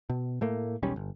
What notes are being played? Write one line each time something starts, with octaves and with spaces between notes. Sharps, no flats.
B2
A2 A3 A#3
E1 B1 G3 C#4
G1